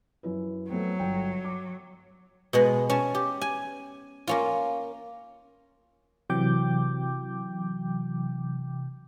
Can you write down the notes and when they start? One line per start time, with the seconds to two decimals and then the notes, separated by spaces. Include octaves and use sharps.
0.23 F#2 E4 B4
0.69 F#3 A3 B3 C4
0.99 G1 G5
1.45 D6
2.53 B2 G#3 B3
2.90 C#4 A5
3.15 G4
3.41 G#5
4.27 A#3 C#4 F4
6.30 C3 E3 F#3 G5 D6 G6